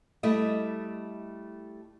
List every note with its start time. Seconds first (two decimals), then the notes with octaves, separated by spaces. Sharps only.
0.23 G3 A3 E4 D#5